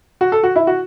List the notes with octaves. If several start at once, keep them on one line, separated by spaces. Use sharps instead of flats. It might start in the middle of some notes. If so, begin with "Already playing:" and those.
F#4
A4
F#4
E4
F#4